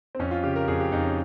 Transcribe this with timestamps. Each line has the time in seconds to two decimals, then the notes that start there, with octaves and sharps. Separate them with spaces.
0.15 C4
0.19 F2 C#4
0.31 F4
0.43 C#3 G4
0.56 A#4
0.68 F2 G#4
0.80 G4
0.92 F2 D#4
1.04 C#4